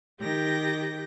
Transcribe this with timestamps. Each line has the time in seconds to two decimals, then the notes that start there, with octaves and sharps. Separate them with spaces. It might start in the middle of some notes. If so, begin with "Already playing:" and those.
0.20 D#3 G4 G6 A#6